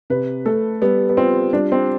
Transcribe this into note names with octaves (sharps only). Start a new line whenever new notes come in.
C3 B4
A3 A4
G3 B3
B3
C4 F4
G3 D4
C4